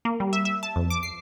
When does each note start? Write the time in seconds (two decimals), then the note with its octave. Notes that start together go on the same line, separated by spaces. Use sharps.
0.05 A#3
0.20 G3
0.33 E5
0.45 E5
0.63 A5
0.76 F2
0.90 D6
1.03 C7